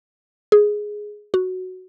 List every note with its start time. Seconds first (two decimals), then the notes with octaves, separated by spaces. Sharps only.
0.52 G#4
1.34 F#4